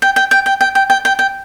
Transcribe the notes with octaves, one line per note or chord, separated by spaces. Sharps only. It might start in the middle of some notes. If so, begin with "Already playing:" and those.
G5
G5
G5
G5
G5
G5
G5
G5
G5